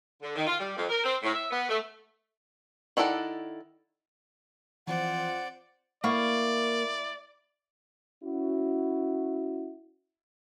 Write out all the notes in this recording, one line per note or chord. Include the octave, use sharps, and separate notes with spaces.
D3
D#3
F4
G3
F2
A#4
C4
A2
E5
B3
A3
D#3 E4 A4 D5 F#5
E3 F3 C4 F4 C5 D5 F#5
A#3 E4 D5 F5 C#6
C#4 E4 F#4